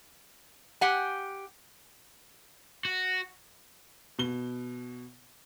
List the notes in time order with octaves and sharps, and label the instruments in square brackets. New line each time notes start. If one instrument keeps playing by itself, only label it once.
[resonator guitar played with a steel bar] G4 F#5 G#5
[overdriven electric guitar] F#4
[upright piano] B2 G7